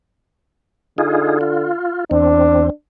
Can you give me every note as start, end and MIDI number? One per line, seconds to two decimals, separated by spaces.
0.98 1.68 50
0.98 1.38 63
0.98 1.38 65
0.98 1.38 68
1.41 2.04 65
2.11 2.70 40
2.11 2.70 60
2.11 2.70 62